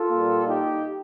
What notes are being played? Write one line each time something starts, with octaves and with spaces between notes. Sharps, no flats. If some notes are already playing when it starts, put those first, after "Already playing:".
Already playing: F4 A4
A#2 G3 A#3
D#4 G4